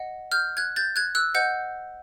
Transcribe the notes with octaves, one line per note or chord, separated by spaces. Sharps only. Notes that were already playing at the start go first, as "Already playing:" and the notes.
Already playing: D#5 F#5
F6 G6
F#6 G#6
G6 A6
F#6 G#6
E6 F#6
C5 D#5 F#5 G6